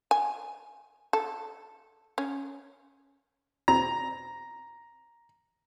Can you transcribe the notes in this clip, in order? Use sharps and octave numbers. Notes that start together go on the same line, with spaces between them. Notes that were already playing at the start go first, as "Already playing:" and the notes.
G#5
A4
C#4
E2 B2 C4 A#5